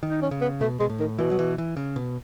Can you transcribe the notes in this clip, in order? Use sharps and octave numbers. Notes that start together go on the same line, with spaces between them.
D#3
D#4
C#4
C#3
B3
B2 A3
B2 G#3
A2
D#3
B2 E3
F#3
E3
E3
C#3
B2